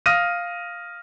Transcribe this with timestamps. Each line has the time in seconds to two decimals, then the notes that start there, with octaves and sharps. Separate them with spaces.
0.06 F5 D#6 F6 A#6 D#7